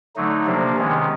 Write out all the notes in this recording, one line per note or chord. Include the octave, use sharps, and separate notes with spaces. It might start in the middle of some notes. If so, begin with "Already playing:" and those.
D3 F#3 A3 D#4
C3 F3 A#3 D4
C3 D#3 G#3 B3 C#4